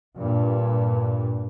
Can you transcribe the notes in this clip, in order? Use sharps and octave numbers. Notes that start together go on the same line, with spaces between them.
G2 A#2